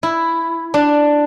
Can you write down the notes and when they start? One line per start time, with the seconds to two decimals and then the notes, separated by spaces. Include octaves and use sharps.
0.03 E4
0.74 D4